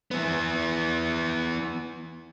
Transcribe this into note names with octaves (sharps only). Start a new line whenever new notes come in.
E3 B3